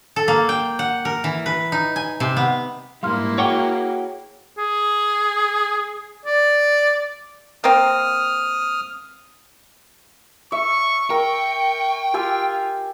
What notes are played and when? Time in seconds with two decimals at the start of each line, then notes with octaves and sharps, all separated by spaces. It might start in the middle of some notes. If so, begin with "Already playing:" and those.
0.16 A4
0.28 A#3
0.49 G5
0.79 F#5
1.05 A#4
1.24 E3
1.46 B4
1.72 D#4
1.96 G#5
2.20 C3
2.36 B3
3.03 G#2 G3 A#3 E4 F5 C6 F6
3.38 F#4 G#4 C#5 F#5 G5 C#6 D6
4.58 G#4
6.26 D5
7.64 A#3 C4 D#6 F6
10.52 E5 C#6
11.10 A#4 G5 C#6
12.14 F4 G4 G#5 E6